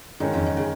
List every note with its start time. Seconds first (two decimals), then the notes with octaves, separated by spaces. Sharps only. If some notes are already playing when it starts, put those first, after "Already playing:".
0.20 G#2 D#3 G#3 C#4
0.33 F2
0.46 G#2
0.57 C#3